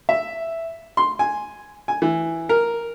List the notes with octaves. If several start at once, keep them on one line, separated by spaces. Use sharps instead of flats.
E5
C6
G#5
G#5
E3
A#4